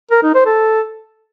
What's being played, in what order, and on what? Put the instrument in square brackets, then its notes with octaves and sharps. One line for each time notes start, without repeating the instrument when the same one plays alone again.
[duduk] A#4
D#4
C5
A4